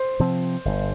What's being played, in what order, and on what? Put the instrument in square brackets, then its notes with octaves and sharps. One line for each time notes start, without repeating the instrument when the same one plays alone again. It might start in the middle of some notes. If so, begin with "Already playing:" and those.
Already playing: [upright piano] C5
[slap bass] C3 F3 C4
G1